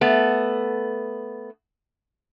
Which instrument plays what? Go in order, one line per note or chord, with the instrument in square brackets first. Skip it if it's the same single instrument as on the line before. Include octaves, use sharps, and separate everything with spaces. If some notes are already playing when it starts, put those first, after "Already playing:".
[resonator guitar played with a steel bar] A3 B3